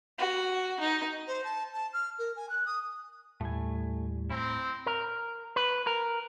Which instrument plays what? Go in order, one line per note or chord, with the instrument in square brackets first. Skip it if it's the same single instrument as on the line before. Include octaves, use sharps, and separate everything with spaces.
[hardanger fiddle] F#4
D#4
[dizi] C5
A5
A5
F6
A#4
G#5
F#6
D#6
[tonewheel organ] D#2 G3 [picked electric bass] A2 [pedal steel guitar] A3 G#5
[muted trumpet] C4 [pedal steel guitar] E4 A#5
[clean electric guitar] A#4
B4
A#4